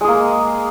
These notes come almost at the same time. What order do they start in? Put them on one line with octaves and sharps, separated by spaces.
G#3 G#4 A#3